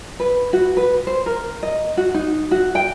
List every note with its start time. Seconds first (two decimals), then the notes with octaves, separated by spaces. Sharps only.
0.20 B4
0.53 F#4
0.77 B4
1.07 C5
1.26 A#4
1.63 D#5
1.97 F#4
2.14 D#4
2.51 F#4
2.75 G5